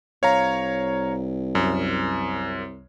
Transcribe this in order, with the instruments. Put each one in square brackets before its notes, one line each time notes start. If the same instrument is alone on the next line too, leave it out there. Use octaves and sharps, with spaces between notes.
[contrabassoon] C2 [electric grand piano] C#5 F5 A#5
[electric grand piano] F#2